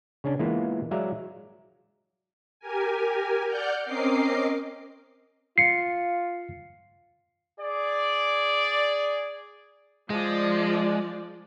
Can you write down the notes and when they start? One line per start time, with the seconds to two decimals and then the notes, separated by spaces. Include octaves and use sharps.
0.24 C#3 C#4 D4
0.39 E3 G#3 A#3 B3 E4 F4
0.91 F#3 G#3 D5 E5 F5 A#5
2.60 G4 A#4 G#5
3.45 D5 F#5 F6 G6
3.83 C4 C#4 A#4 D#5 D6 C7
5.58 F4 C7 C#7
7.59 G#4 D5
10.10 F3 G#3 D5